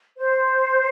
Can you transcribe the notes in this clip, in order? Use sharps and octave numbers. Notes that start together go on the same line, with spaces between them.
C5